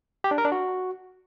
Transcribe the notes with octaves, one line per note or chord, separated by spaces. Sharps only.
G4
D4
A#4
D4
F#4